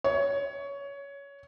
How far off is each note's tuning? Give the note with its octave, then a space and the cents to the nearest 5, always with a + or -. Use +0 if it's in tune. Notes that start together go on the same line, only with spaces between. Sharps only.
C#5 +15